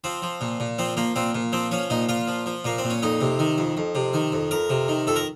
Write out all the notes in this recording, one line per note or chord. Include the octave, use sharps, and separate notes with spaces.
F3 C4
F3
A#2
A#2
F3 C4
F3 A#3
A#2 C4
A#2
F3 C4
F3 C#4
A#2 D#4
A#2 F4
F3
F3
A#2 A#3
C4
A#2
C#4
F2 D#4
C3
D#3
F2
F2
C3
D#3
F2
F2 A#4
C3
D#3
F2 A4
A#4